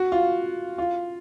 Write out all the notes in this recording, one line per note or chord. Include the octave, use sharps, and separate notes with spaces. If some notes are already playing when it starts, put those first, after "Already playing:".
Already playing: F#4
F4
F4